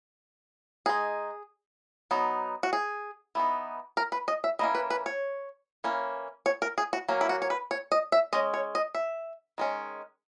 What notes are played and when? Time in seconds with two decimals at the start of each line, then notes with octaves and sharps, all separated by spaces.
0.86 G#3 D#4 G#4
2.11 F#3 B3 D#4
2.63 F#4
2.73 G#4
3.35 E3 B3 D#4
3.97 A#4
4.12 B4
4.28 D#5
4.44 E5
4.59 E3 A#3 C#4 D#5
4.75 B4
4.90 B4
5.06 C#5
5.84 E3 A#3 C#4
6.46 C#5
6.62 A#4
6.78 G#4
6.93 F#4
7.08 F#3 A#3 C#4
7.21 E4
7.29 F#4
7.42 C#5
7.50 B4
7.71 C#5
7.92 D#5
8.12 E5
8.33 G#3 C#4 D#5
8.54 C#5
8.75 D#5
8.95 E5
9.58 D#3 G#3 C#4